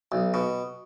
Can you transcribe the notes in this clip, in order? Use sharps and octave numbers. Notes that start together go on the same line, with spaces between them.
B1
B2